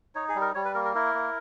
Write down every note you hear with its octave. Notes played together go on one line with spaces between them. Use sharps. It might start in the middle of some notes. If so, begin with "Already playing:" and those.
D#4 C#5
G#4
G3
A#4
G3 C#5
B4
A#3 A#4
A#4
E4 A#4
A#3